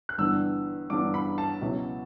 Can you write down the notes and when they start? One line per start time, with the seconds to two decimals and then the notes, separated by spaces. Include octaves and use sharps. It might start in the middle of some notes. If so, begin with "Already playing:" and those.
0.09 F#6
0.18 G1 G2 E3 B3 D4 E6
0.90 G1 G2 E3 B3 D4 D6
1.14 B5
1.38 A5
1.61 C#2 B2 F#3 C#4 E4